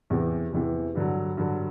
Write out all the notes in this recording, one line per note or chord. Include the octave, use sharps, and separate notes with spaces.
E2 C3 E3
E2 C3 E3
G2 D3 F#3
G2 D3 F#3